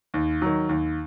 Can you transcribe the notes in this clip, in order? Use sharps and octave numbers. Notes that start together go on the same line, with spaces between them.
D#2
D#3 F#3
D#2